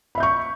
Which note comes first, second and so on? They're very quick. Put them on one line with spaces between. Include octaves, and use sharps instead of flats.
B5 E5 G6 C#6